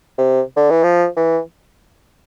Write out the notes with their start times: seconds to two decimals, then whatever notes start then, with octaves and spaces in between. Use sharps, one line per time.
0.18 C3
0.56 D3
0.70 E3
0.83 F3
1.17 E3